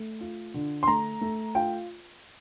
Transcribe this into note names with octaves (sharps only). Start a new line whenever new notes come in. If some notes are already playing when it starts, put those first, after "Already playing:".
Already playing: A3
F4
D3
C6
A3 A#5
A3
F4 G5